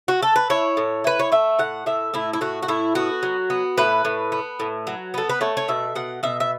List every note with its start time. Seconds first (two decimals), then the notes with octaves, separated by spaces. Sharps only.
0.08 F#4
0.23 A4
0.36 B4
0.50 E4 C#5
0.77 A2
1.04 E4 B4
1.19 C#5
1.32 A3 E5
1.59 A2 F#5
1.86 A2 E5
2.14 A2 E4
2.33 E4
2.41 A2 F#4
2.63 F#4
2.68 A2 E4
2.95 B3 F#4
3.23 F#3
3.50 B3
3.78 A2 B4
4.05 A2
4.32 B3
4.60 A2
4.87 F#3
5.14 B3 A4
5.29 B4
5.41 A3 C#5
5.57 C#5
5.68 B2 E5
5.95 B2 F#5
6.23 B2 E5
6.40 E5